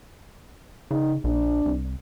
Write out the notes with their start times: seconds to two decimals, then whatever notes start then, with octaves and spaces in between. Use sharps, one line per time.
0.91 C#3 D#4
1.24 A#1 D4
1.65 C2